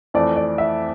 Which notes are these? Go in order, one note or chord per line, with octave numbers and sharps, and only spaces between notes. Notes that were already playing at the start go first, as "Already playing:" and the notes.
F2 E3 A3 D5
D5
E5